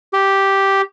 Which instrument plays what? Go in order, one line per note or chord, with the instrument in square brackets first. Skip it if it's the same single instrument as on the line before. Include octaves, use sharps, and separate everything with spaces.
[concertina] G4